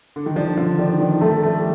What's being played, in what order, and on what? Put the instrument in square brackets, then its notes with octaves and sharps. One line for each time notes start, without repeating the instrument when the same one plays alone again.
[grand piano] D3
D#3
[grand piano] F3 [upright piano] D4
[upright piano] D3 [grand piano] F3
[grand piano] D#3 [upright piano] D4
[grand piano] D#3 [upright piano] D4
[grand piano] F3 [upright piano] A3
[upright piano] A3
[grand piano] G3